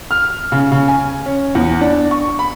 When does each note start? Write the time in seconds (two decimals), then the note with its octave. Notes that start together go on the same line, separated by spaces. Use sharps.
0.11 F6
0.52 C#3
0.72 C#3
0.88 G#5
1.26 C#4
1.55 E2
1.81 D4
2.11 C#6
2.39 B5